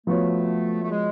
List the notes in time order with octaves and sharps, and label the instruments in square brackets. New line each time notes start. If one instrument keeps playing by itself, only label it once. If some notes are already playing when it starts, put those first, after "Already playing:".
[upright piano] F3 B3 F#4 C#5 [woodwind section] A3
[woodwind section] A3
G#3